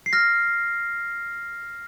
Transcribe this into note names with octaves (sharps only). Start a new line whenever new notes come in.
C7
F6 A#6